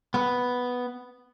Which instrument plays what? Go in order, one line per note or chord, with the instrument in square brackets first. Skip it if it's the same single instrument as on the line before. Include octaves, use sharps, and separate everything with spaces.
[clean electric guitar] B3